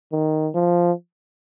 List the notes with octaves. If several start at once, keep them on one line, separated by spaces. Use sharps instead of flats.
D#3
F3